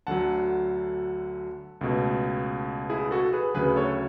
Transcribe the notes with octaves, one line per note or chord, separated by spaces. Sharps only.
D2 D3 F#3 F#5 A5
C#2 B2 A3
E4 G#4
F#4 A4
G#4 B4
D2 C#3 F#3 G#4 B4
A4 C#5